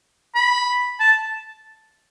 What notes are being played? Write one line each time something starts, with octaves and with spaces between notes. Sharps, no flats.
B5
A5